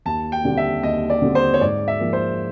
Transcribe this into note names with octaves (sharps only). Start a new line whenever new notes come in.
D#2 A5
G5
D3 G3 C4
E5
D#2 D#5
D5
D3 G3 C4
C5
C#5
G#2 D5
E5
F3 A#3
C5